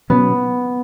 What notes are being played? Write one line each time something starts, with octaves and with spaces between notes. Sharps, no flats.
B2 F#3 B3 C#4